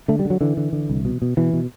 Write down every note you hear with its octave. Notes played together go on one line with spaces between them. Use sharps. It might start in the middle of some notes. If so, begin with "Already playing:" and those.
D3 A3
G3
D3
F#3
D3 E3
D3
D3
C2
B2
B2
B2 E3
B2